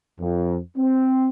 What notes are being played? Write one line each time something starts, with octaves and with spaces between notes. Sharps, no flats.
F2
C4